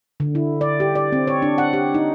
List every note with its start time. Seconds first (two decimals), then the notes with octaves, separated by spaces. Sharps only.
0.20 D3
0.35 E4
0.61 D5
0.80 G4
0.95 D5
1.12 C4
1.27 C#5
1.42 D4
1.58 F#5
1.73 G4
1.94 D#4